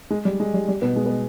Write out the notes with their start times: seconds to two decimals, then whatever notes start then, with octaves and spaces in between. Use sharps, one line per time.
0.10 G#3
0.25 G3
0.40 G#3
0.54 G3
0.68 G3
0.82 B2 B3
0.96 G#3
1.06 B3